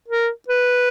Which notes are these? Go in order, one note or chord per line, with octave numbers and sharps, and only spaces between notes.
A#4
B4